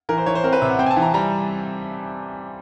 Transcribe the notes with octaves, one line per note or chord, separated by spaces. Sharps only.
E3 A#4
C5
E3 C#5
C5
C4 A#4
B4
C3 E5
F#5
C4 G5
G#5
A5
E3
A#5
G3 A#5